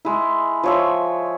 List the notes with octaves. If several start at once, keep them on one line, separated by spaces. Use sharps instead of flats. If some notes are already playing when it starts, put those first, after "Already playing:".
G#3 E4
F3 C#5 E5